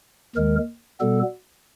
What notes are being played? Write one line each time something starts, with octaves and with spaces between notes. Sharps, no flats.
D#2 D#3 G#3 A#4
B2 G3 B3 A4